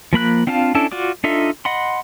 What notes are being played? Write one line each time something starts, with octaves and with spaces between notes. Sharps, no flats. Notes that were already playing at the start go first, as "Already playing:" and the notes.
F3 A#3 B5 F#6
C4 D4 F4 F5 A5
C#4 D4 E4 A4 A5
F4 F#4 D5 D6
D4 D#4 F4 A4 E5
D#5 F#5 B5 C6